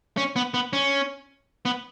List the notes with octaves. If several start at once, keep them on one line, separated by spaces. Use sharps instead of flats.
C#4
B3
B3
C#4
B3